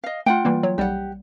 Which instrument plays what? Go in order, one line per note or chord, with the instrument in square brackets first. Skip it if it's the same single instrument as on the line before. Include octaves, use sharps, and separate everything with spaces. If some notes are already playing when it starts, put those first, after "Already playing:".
[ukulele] D#5 F5
[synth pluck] A3 [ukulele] F4 F#5 G5
[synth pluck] E3 G3 A#3
F#3 C#5
[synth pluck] B1 G3 [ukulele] G4 F#5